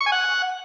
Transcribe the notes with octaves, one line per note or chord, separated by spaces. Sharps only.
C#6
G#5
F#5